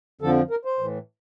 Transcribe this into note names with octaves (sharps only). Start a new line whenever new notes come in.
F2 D3 F3 A4
A#4
C5
A2 E3